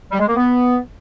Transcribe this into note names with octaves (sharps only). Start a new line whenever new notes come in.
G3
G#3
A#3
B3